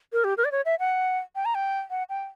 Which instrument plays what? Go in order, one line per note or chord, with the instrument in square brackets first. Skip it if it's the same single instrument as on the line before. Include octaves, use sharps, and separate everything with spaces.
[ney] A#4
G4
A#4
D5
C#5
E5
F#5
G5
A#5
G5
F#5
G5